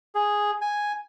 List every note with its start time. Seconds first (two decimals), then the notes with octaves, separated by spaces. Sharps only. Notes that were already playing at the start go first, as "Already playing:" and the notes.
0.15 G#4
0.62 G#5